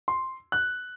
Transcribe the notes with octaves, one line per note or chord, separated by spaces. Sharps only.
C6
F#6